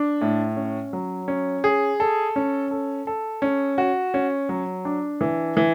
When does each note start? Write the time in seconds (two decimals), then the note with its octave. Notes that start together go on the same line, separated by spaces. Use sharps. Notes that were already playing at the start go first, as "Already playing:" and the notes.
Already playing: D4
0.21 A2
0.57 C#4
0.93 F#3
1.28 C#4
1.64 G#4
2.00 A4
2.36 C#4
2.71 A4
3.07 A4
3.42 C#4
3.78 F#4
4.14 C#4
4.49 F#3
4.85 D4
5.21 E3
5.57 E3